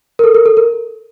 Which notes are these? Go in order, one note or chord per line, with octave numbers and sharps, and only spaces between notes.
A#4
A4
A#4
A4
A#4